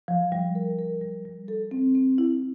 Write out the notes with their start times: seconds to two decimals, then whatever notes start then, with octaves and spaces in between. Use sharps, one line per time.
0.08 F3
0.32 G3
0.55 A#4
0.79 A#4
1.02 G3
1.25 G3
1.48 A4
1.71 C4
1.95 C4
2.18 E4